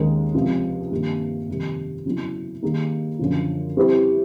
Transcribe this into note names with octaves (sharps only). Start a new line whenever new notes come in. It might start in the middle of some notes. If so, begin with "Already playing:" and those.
Already playing: D#2 D#3 G#3 C#4
C#2 C3 F3
G2 D#3 G3 A#3
F2 C3 D#3 G3
C#3 F#3 B3 E4
D#3 G3 A#3 D#4 G#4
F#2 D3 F3
G3 C4 E4 G4 B4